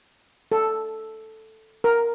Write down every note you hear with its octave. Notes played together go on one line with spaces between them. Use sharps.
A4
A#4